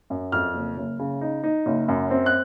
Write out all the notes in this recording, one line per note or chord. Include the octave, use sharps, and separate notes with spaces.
F#2
F2 F6
F#1
F#1
C#3
D#4
D#4
F#1
F#2
C4
F#6